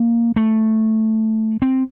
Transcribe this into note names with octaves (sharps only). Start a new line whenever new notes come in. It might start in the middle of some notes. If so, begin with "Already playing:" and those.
Already playing: A#3
A3
C4